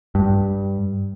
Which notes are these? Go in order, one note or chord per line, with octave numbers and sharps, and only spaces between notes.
G2